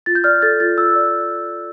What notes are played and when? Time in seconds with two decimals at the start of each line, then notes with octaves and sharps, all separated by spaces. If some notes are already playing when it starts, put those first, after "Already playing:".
0.06 F4 A6
0.15 G6
0.24 D5 F6
0.42 A4 A6
0.60 F4 A6
0.78 F4 E6
0.96 D5